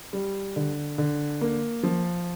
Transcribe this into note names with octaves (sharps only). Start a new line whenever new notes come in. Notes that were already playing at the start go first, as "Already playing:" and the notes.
G3
D3
D3
A#3
F3